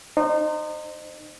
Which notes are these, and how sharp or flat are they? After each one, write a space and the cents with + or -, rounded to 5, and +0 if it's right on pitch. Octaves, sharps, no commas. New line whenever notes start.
D#4 -30 C5 +0